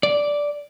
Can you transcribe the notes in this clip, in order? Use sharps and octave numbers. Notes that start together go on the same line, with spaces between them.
D5